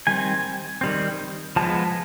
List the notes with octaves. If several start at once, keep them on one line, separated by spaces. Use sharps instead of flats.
D#3 G3 C4 G#5
D#3 G3 C4
F3 G#3 B3 A5